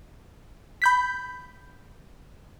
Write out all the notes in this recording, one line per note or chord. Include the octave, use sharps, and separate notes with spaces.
B5 G6 B6